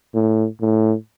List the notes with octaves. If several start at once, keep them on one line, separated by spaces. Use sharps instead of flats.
A2
A2